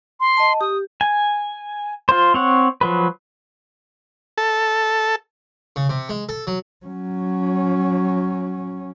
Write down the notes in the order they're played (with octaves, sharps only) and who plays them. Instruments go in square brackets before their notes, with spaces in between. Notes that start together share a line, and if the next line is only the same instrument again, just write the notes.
[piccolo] C6
[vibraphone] D#5 A5
[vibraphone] G4 [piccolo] D#6
[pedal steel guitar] G#5
F4 C5
C4 C#5 F#5
F3 F#3 B4
[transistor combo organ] A4
[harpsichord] C#3
C3
G#3
A4
F#3
[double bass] F#3 C#4